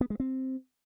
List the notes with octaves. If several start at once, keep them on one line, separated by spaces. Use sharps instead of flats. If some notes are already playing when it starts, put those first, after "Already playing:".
B3
G#3
C4